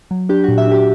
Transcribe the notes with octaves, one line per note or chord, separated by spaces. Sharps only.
F#3
D4 G4
A#2 F#4
E5
D4 G4